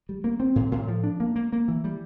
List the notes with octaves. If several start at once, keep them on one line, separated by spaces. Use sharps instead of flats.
G3
A#3
C4
A2
A2
F3
D4
A#3
A#3
A#3
E3
G3